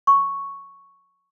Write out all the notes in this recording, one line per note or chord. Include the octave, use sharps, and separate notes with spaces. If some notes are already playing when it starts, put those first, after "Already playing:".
C#6